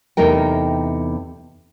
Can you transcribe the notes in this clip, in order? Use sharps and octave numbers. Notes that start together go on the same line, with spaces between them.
E2 C3 A3 D#4 A#4 G5